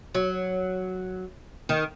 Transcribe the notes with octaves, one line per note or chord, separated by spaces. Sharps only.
F#3
D#3